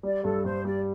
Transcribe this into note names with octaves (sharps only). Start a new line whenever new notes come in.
G3 D5
G2 A4
G2 C5
G3 D5